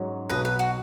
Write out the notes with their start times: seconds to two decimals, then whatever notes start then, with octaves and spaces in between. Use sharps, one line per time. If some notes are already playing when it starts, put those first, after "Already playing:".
Already playing: G#2 F#3 C#4
0.29 B1 B2 F#3 B4 D#5
0.45 B4
0.59 F#4